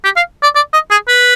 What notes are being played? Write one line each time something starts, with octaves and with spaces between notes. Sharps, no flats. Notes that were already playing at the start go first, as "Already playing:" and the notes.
G4
F5
D5
D5
D#5
G#4
B4